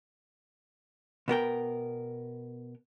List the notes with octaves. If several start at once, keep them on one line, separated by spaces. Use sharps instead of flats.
B2 B3 A#4 G5